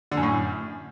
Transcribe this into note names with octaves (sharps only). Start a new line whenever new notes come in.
D3
F#2
A2
F#2